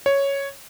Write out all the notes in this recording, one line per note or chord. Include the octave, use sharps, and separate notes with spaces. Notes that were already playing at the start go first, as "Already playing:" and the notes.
C#5